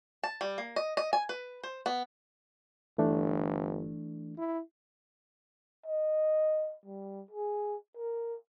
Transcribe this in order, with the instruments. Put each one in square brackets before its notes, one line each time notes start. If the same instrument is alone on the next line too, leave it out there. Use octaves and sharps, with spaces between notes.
[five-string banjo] A5
G3
A#3
D#5
D#5
G#5
B4
C5
B3
[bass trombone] G1 [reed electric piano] E3 A3 D4
[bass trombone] E4
[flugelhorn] D#5
G3
G#4
A#4